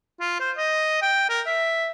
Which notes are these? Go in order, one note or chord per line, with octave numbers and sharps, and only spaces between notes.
F4
C5
D#5
G5
A#4
E5